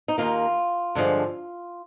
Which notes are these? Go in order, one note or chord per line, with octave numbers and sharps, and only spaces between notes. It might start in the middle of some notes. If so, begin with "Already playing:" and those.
D#4
D#2 D#3 A#3 F4
G2 D3 F3 G#3